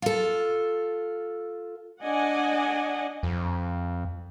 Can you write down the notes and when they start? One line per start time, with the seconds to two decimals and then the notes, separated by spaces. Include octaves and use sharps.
0.02 F4 A4
2.04 D4 D5 D#5 F#5 G#5
3.23 F2